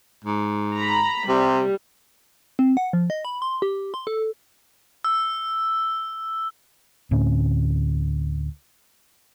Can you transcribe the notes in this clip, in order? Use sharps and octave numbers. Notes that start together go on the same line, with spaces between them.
G#2
A#5 B5
C3 G3
C4
F#5
F3
D#5
B5
C6
G4
C6
A4
E6
D2 A2 C4 C#4